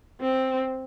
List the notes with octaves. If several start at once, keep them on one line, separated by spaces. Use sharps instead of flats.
C4